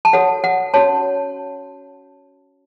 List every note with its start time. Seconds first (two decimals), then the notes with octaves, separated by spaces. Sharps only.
0.05 A5
0.13 F#4 A4 C#5 F#5
0.44 F#5
0.74 C#4 F#4 C#5 A5